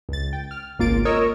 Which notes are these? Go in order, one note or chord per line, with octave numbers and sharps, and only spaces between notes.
C#2 A6
G5
F6
G#1 C#2 A#3 F4 A6 D7
A#4 C#5 D#5 C#6 D#6 E6